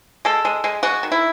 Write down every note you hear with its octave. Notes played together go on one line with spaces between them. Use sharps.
G#3 A4
G#3
G#3
G#3 F#4
D#3
E4